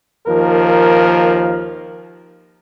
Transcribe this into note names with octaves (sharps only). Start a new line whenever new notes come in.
D#2 F3 A#4